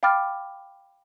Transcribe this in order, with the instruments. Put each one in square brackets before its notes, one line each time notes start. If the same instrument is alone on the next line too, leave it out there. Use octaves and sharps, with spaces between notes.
[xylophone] F5 G5 B5 D6 F6 A6